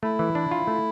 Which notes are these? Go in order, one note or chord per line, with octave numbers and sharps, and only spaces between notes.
A3 E4
E3
D4
F4
A3